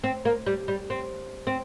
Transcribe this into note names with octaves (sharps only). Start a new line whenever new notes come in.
C4
A#3
G3
G3
C4
C4